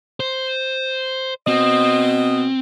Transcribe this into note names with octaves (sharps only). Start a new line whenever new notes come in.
C5
B2 C4 D#5